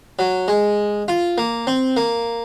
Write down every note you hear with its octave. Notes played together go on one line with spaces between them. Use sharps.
F#3
G#3
F4
A#3
C4
A#3